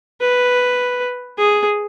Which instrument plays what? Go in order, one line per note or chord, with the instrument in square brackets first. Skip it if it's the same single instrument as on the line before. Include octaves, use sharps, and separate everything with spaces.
[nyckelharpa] B4
G#4